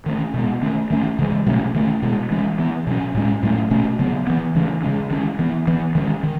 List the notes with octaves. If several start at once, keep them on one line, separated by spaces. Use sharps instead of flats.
D#3 A3 C#4
B2 G#3 B3
D#3 A3 C#4
D#3 A3 C#4
C#3 E3 G#3
B2 F#3 A3 C#4
D#3 A3 C#4
B2 G#3 B3
E3 G#3 C#4
E3 B3
B2 F#3 C#4
A2 G#3 C#4
A2 F#3 A3 C#4
B2 A3 C#4
C#3 F#3 B3
E3 B3
C#3 E3 A3 C#4
C#3 G#3 C#4
D#3 G#3 C#4
E3 B3
E3 B3
D#3 G#3 C#4
D#3